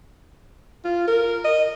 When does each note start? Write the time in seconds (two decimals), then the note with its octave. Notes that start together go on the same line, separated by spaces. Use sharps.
0.84 F4
1.07 A#4
1.44 D#5